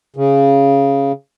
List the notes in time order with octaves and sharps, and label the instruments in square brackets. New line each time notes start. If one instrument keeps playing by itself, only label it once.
[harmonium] C#3